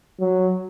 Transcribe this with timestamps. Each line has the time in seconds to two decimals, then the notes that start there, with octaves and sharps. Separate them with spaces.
0.20 F#3